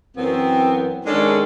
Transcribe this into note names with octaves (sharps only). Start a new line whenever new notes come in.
F#2 E3 B3 C4
D#3 G#3 C#4 D4 G#4 A4